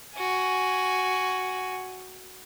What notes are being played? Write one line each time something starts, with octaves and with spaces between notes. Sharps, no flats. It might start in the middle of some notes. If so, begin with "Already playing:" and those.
F#4 G#5